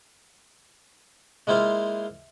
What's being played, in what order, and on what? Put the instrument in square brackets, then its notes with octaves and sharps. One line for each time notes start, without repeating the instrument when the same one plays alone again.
[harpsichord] G#3 A#3 E4 F4 C5 F5